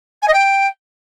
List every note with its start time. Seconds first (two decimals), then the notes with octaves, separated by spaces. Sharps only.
0.22 G#5
0.28 D#5
0.33 G5